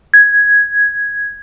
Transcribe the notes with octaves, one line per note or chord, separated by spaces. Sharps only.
G#6